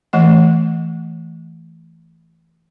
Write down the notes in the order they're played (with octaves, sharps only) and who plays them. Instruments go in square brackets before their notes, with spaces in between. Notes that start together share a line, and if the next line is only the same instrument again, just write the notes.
[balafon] E3 A3 D#5